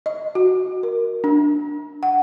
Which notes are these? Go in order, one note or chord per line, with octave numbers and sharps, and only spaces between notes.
D#5
F#4
A#4
D4
F#5